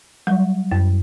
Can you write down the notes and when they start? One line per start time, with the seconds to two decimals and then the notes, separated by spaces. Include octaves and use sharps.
0.27 F#3 G3
0.72 F#2